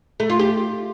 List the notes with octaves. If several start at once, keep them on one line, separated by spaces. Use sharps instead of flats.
A3
F4
G4